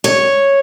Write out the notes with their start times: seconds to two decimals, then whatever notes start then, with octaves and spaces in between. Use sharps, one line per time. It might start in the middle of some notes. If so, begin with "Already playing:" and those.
0.04 C#5